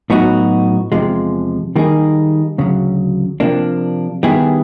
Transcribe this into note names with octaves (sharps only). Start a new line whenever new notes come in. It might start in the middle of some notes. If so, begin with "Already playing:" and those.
A2 F#3 B3 D#4 F#4
E2 C3 F3 G#3
D#3 G3 A#3 D#4 G#4
D2 C#3 F#3
C3 F3 A#3 D4
D#3 G3 B3 E4 G#4